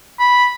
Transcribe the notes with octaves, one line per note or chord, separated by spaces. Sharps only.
B5